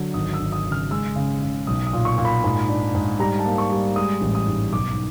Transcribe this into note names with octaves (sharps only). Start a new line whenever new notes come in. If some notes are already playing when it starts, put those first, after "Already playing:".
Already playing: D3 F#3
G#1 D#6
E6
G#1
D#6
C#3
F6
G#3 E6
C#3
C#3
B1 D#6
D#6
A#2
C#6
A#2
B5
G#2
D4
G#2
G3 A#5
A5
A#3
C#6
G3
G#3 D#6
A1
D#6
G#2
B1 D6